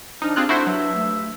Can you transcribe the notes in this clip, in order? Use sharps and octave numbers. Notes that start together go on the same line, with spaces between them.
A#2 F3 D4 D#4 F6
G#3 C4 F4 G4 G#4 F#6
A3 E4 F#4 C5
G2 F#3 E5
A3